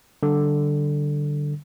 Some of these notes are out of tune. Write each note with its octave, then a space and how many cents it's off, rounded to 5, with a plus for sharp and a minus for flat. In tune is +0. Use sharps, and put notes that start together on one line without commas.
D3 +0 G3 -30